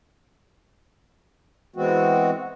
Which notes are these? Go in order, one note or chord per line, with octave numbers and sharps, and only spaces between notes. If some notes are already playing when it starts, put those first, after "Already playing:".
E3 G#3 B3 C4 F#4